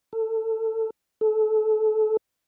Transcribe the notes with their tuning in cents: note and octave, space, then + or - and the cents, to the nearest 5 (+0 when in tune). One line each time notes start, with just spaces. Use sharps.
A4 +20
A4 -25